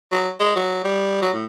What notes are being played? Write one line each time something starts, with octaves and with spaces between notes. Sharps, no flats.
F#3
G#3
F#3
G3
F#3
A2